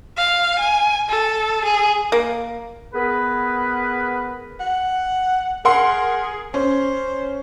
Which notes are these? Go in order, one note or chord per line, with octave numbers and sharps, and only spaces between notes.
F5
G#5
A4
G#4
A#3
B3 G#4 A#4 B4
F#5
G#4 A#4 F#5 C6
C#4 C5